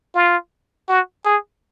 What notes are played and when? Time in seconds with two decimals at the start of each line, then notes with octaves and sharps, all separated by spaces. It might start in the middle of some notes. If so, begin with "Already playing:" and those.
0.15 F4
0.89 F#4
1.25 G#4